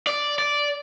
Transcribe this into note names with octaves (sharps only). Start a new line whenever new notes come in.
D5
D5